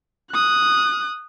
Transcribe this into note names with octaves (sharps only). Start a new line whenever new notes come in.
D#6 F#6